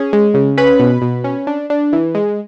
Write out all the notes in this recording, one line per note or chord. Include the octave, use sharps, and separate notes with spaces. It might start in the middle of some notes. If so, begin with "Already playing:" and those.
Already playing: C#4 G#4
G#3
C#3
C#4 B4 B5
B2
B2
C#4
D4
D4
E3
G#3